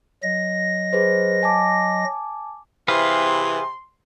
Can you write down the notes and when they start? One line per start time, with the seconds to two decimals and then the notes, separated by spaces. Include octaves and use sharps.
0.23 F#3 D#5 A#6
0.93 G#4 B4 C5
1.43 G#5 A5 D6
2.88 C3 E3 G#4 B4 F5 C6